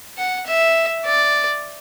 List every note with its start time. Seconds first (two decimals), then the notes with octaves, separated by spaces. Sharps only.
0.18 F#5
0.47 E5
1.05 D5